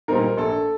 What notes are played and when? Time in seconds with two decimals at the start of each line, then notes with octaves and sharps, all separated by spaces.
0.08 A#2 G3 C4 D#4 A#4
0.37 A#1 A4